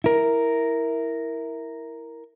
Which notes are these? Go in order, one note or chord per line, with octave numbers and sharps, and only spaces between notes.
E4 A#4